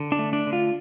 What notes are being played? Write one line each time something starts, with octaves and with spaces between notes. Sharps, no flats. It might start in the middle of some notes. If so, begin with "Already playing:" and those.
Already playing: D3
D4
A3
D4
D3
F4